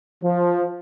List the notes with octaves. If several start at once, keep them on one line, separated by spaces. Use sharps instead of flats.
F3